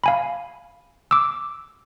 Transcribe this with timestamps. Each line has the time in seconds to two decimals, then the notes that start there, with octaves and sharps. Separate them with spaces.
0.04 F5 G#5 B5
1.11 D6 E6